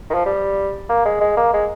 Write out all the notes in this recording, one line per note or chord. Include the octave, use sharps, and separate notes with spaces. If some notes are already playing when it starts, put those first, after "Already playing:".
D#3
F3
G3
A#3
G#3
G#3
A#3
G#3